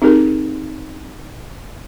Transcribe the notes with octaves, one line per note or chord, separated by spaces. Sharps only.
C4 D#4 G4 G#4 A#4